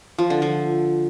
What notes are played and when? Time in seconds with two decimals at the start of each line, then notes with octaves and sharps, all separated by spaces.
0.18 F3
0.30 D3
0.42 F3